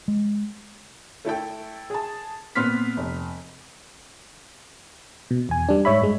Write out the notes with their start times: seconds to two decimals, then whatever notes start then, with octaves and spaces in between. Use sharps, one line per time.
0.08 G#3
1.25 A3 E4 A4 G5
1.90 G#4 A5
2.55 A#2 B3 C4 C6 F6 B6
2.97 F1
5.31 B2
5.49 E2 G#5
5.69 G3 D4
5.85 G#2 C#5 E5 B5
6.02 G2 G#3